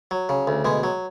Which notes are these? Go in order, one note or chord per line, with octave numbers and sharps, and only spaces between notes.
F#3
C#3
D2
B2 G#3
F#3